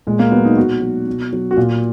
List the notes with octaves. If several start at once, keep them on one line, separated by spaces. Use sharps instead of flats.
A#2 G#3
A#3
F#3 B3
D#4
B2 F#4
F#3
B2
F#3
F#4
A#2 F4